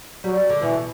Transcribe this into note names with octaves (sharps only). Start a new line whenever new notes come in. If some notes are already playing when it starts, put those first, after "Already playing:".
F#3 G3
D3
B2 E3